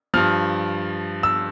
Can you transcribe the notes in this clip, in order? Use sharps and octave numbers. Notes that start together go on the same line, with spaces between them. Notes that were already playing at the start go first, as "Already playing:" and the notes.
G2 F3 F6
E6